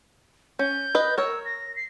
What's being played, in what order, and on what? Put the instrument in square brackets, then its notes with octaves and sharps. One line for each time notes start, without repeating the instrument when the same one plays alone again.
[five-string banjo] C#4 [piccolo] G6
[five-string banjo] B4 D#5
[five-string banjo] A#4 C#5 [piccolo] E6
[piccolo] A#6
C7